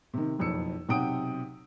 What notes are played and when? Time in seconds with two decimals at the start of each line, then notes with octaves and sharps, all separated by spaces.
0.14 C3 D#3
0.38 F#1 B1 F2 E6 C#7
0.89 B1 C3 F#5 G5 D#6 D7